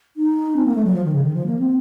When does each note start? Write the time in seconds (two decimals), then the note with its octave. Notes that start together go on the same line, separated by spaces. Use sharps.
0.17 D#4
0.56 C4
0.65 A#3
0.75 A3
0.85 F#3
0.94 F3
1.04 D#3
1.14 C#3
1.23 D#3
1.34 F3
1.46 A#3
1.59 C4